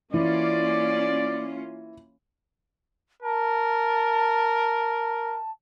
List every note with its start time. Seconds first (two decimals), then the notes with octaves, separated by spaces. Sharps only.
0.14 E3 A#3 C#4 F4 D5
3.22 A#4 A5